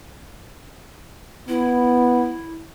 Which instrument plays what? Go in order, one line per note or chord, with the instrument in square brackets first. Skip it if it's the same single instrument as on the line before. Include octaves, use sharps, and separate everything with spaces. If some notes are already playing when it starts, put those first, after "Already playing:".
[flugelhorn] B3 [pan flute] E4